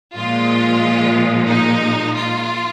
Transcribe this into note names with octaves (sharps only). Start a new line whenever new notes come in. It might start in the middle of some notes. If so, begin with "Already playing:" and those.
A#2 F3 G#3 F4
D#4
F4